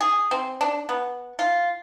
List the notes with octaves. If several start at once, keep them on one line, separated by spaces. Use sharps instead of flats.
G#4
C4
D4
B3
F4